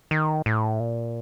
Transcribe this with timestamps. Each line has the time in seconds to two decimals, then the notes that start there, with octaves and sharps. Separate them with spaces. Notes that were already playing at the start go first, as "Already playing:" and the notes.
0.11 D#3
0.46 A2
0.80 A#2